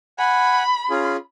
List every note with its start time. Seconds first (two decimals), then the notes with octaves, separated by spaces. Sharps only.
0.19 F#5 G#5 B5
0.90 C#4 F4 G#4